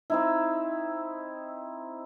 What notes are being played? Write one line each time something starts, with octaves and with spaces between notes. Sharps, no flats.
C4 D#4 E4